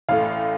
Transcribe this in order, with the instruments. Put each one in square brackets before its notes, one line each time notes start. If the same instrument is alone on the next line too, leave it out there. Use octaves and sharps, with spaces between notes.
[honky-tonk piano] A1 A2 A3 F5